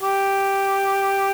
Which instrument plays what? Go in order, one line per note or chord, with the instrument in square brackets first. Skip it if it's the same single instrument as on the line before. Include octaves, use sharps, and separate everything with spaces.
[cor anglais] G4